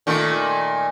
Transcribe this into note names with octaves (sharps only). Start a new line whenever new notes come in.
A#2 D#3 A3